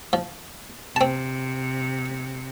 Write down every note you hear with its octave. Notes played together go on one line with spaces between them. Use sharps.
F3
C3 C4 A5